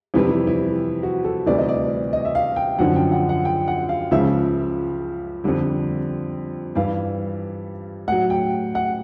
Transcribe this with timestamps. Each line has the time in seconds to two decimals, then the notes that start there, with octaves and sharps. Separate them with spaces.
0.14 F2 C3 E3 G3 E4
0.47 E4
1.03 F#4
1.25 A4
1.46 D2 C3 E3 G3 D5
1.58 D#5
1.69 D5
2.13 D#5
2.25 E5
2.35 F5
2.56 G5
2.79 F#2 D3 F3 F#5
2.96 G5
3.12 F#5
3.29 F#5
3.45 G5
3.68 F#5
3.89 F5
4.11 C#2 C#3 F3 E5
5.44 F2 D3 G3
6.75 G2 E3 G3 F5
8.08 A2 F#3 F#5
8.30 G5
8.75 F#5